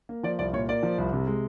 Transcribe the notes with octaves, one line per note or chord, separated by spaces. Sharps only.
A#3
F3 D5
C2 D5
A#2 C#5
A#3 D5
F3
C2
C3
G#3